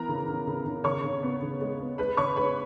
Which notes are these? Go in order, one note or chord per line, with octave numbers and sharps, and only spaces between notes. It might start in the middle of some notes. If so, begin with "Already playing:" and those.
Already playing: E3 B3 A#4 A#5
C#3
C#3
C#3
C#3
C#3 C#5 C#6
C#3
B3
C#3
G#3
B3
G#3 B4 B5
C#3 C#5 C#6
G#3 B4 B5